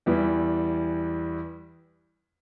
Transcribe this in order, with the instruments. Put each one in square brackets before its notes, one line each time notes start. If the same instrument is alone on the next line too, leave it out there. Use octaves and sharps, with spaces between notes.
[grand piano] E2 E3 G3